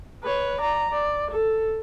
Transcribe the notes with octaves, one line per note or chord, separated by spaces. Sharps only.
B4 C#5
D5 A#5
D5
A4